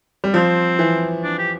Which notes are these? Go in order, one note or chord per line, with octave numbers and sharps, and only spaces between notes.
G3
F3 C4
E3
D4
G4